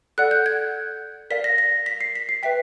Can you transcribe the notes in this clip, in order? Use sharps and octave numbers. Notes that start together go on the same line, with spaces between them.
A4 D5 F#5 F#6
G6
G#6
A#4 D5 F5 B6
A#6
A#6
B6
C7
B6
C7
B4 E5 G5 B6